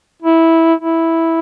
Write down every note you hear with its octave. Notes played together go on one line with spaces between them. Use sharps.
E4
E4